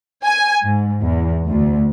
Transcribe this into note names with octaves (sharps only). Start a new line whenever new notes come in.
G#5
G#2
E2
D2